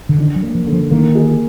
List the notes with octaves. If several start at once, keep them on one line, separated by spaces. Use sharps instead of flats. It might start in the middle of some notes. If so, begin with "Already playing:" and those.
D3
D#3 D4
F#3
A#3
F3
D3
F3
D#3 A#3
G#4